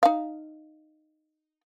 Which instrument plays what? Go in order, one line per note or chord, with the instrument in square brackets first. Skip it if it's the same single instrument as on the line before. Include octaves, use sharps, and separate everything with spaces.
[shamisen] D#4 F5